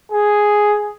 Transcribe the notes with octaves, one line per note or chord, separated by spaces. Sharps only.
G#4